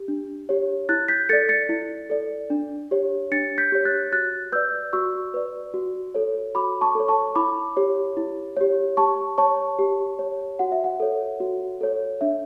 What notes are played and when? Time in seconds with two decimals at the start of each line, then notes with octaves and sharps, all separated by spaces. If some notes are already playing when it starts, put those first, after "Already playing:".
Already playing: G4
0.08 D4
0.49 G4 C#5
0.89 E4 F#6 A6
1.08 G6 B6
1.29 A4 D5 A6 C#7
1.49 A6 C#7
1.69 E4
2.10 A4 D5
2.50 D4
2.91 G4 C#5
3.32 D4 A6 C#7
3.58 G6 B6
3.72 G4 C#5
3.85 F#6 A6
4.12 F#4 F#6 A6
4.52 B4 D5 E6 G6
4.93 F#4 C#6 E6
5.34 B4 D5
5.74 F#4
6.14 A4 C#5
6.55 F#4 B5 D6
6.81 A5 C#6
6.95 A4 C#5
7.08 A5 C#6
7.36 E4 B5 D6
7.77 G4 C#5
8.17 E4
8.57 G4 C#5
8.97 G4 A5 C#6
9.38 C#5 A5 C#6
9.79 G4
10.19 C#5
10.59 F#4 F#5
10.72 E5
10.84 F#5
11.00 A4 C#5
11.40 F#4
11.81 A4 C#5
12.21 D4 E5